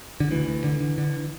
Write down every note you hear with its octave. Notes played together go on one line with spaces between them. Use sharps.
D3
D2 E3
D2
D3
D3
D3